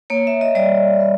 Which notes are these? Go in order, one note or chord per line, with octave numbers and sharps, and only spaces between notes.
A#3 C#5
E5
D#5
G3 D5
G3